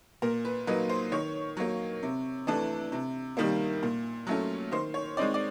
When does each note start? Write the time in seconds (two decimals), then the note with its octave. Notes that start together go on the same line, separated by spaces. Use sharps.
0.22 A#2 A#4
0.45 B4
0.67 F#3 A#3 D#4 B4
0.89 C5
1.12 D#3 C#5
1.57 F#3 A#3
2.03 C3
2.47 E3 A3 D4
2.92 C3
3.37 D#3 G3 A#3
3.83 A#2
4.27 F#3 A3 C#4
4.72 D#3 C5
4.94 C#5
5.17 G#3 C4 D#4 D5
5.34 D5